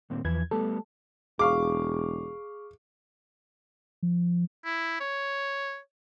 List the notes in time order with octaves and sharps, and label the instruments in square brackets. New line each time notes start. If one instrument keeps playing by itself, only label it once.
[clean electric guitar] D#2 A#2 C4
[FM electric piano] E2 G#6 [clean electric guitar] E3 F3 B4
[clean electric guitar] G3 A3 B3 [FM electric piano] A4
[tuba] E1 [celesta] G#4 C#6 [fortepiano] F5 D6
[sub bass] F3
[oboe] E4
C#5